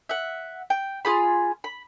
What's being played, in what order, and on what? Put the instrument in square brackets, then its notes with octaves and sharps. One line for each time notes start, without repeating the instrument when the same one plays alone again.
[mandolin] E5 F#5
G5
F4 G#4 B5
B5